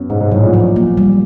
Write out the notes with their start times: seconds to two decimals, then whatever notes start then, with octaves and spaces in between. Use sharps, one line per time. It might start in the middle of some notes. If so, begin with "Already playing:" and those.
Already playing: F#2 B3
0.10 G#2 C#4
0.21 G#2
0.32 A2 F#3
0.43 A#2
0.54 F3
0.76 A#3
0.97 G3